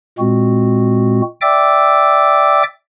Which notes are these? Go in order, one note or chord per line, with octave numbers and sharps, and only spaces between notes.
A#2 G#3 C4 F#4
D5 E5 G5 D6 E6